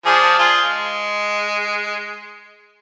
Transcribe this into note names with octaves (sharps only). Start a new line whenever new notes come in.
F3 D4 G#4
F4 G#4
G#3